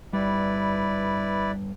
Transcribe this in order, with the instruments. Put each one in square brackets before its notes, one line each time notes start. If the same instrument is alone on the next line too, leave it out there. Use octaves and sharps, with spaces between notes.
[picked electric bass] G1 G3 [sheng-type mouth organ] E4 B4 D5